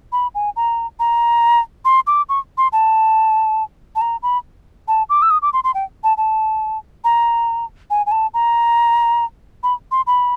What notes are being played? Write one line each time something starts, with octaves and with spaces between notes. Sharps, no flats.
B5
G#5
A#5
A#5
C6
D6
C#6
C6
A5
A5
A#5
B5
A5
D6
E6
D#6
D6
C6
C6
G5
A5
A5
A#5
G#5
G#5
A5
A#5
B5
C6
B5